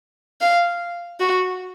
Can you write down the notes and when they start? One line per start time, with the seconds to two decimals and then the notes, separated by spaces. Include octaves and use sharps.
0.41 F5
1.20 F#4